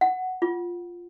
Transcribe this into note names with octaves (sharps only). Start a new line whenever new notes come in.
F#5
F4